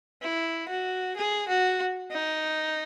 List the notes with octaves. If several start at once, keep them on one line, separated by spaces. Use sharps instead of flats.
E4
F#4
G#4
F#4
D#4